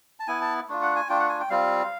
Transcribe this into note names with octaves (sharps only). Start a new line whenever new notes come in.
A5
B3 E4 G#5
A5
A3 D4 F4
F#5
G#5
A3 D4 F4 G5
F#5
G#5
G5
G3 C4 F4 F5